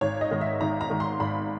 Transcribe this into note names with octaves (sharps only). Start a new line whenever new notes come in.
G#1 C#5
D#5
G#2 D#3
E5
G#1 A#5
A#5
G#2 D#3
C6
G#1 B5